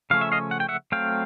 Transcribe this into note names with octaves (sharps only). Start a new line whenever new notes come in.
C#3 F3 A3 C#4 F5
E5
D#5 F5
F#5
G5
E5 F#5
F#3 A3 C4 F5 G5